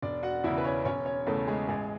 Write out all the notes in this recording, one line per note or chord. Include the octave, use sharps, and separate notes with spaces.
E1 D4 D5
F#4 F#5
E2 C#3 E4 E5
B4
C#4 C#5
E1 C#4 C#5
C#4 C#5
E2 C#3 A3 A4
G#3 G#4
A1 G#3 G#4